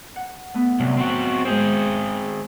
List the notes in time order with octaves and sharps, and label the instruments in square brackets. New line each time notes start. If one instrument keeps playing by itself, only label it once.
[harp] F#5
A3 B3
[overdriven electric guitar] C2 [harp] F#3
[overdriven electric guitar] C4 F#4
[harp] G#3 C5 [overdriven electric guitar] C4 G#4